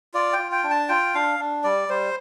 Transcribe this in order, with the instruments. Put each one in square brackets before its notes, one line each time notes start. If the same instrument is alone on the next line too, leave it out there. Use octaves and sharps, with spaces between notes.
[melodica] F4 D5
G5
F4
G5
D4
A5
F4 G5
D4 F5
D4
G3 D5
G3 C5